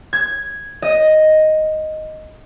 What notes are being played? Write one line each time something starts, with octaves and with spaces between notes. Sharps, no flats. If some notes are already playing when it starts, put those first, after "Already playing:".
G#6
D#5